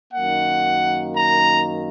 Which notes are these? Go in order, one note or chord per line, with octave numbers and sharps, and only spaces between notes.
F#2 D#3 A#3 F#5
A#5